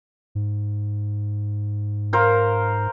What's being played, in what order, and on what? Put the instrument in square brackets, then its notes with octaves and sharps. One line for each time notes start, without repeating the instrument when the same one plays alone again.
[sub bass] G#2
[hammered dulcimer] A#4 C5 F5